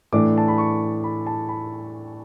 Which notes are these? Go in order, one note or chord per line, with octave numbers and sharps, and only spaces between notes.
A2 E3 A3 D4 D6
A5
B5
C#6
B5
A5
B5